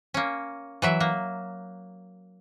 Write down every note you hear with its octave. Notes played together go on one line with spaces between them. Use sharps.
A#3 C#4
E3 F#3 E5
A#3